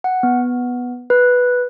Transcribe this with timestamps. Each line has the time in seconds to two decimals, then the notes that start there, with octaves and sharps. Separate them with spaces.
0.04 F#5
0.23 B3
1.10 B4